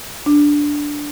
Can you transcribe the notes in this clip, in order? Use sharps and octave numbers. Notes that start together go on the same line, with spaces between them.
D4